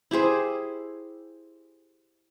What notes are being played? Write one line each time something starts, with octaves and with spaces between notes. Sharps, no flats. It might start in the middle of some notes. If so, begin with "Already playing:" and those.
E4 G4 G#4 C5